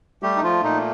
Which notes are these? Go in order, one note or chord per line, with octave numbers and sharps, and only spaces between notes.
G3 A3 G4
D#4
F3 F4
A#2 D#4